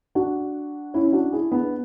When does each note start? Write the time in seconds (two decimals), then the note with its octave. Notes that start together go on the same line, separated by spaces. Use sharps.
0.15 D4 F#4
0.94 C#4 E4
1.08 E4
1.13 D4 F#4
1.32 E4 G#4
1.52 B3 D4